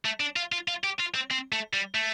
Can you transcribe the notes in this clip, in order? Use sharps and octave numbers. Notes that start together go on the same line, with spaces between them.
A3
D4
F4
F4
F4
G4
F4
C4
C4
A3
G3
A3